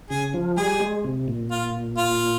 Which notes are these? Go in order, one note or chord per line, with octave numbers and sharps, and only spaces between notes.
C#3 G#4
F3
G3 G#4
G#3
C3
A#2
F4
F4